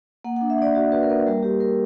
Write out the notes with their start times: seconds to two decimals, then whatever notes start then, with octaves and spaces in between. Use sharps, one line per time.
0.24 A#3 F#5
0.36 F#5
0.41 D4
0.50 E5
0.58 D4 D5
0.75 F#4 D5
0.92 F#4 B4
1.03 A#4
1.09 A#3 B4
1.27 G3 A#4
1.43 G3 G4
1.60 G3 A#4